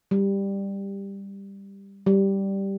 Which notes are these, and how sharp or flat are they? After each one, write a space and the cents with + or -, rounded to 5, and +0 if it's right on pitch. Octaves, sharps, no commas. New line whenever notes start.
G3 +10
G3 -5